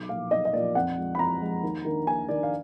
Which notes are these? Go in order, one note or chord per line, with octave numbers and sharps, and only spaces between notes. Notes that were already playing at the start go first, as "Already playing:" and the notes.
Already playing: B1 D6
A#2 F3 F5
B1 D#5
D#5
A#2 F3 D5
F2 F#5
F3 G#3
B5
F2 A#5
F3 G#3
D#2
D#3 A#3 D4
D#2 G#5
D#3 A#3 D4 D5
F5